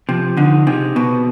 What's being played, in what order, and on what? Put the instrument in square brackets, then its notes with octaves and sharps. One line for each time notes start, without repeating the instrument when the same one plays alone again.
[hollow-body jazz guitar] C3 [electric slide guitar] F3
[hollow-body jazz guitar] D3 [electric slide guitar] D#4
[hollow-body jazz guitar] C3 [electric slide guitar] G#4
[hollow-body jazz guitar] B2 [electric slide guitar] B3